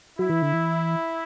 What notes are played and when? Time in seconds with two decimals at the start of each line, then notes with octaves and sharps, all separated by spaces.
0.18 F#3 E4
0.30 E3
0.42 D3
0.53 E3